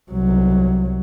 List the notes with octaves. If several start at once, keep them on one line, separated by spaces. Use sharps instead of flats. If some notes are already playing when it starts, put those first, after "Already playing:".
C2 F#3